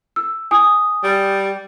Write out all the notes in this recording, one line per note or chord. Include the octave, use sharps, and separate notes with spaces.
E6
G#5 D#6
G3